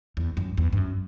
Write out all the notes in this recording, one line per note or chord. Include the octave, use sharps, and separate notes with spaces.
E2
F#2
E2
G2
F#2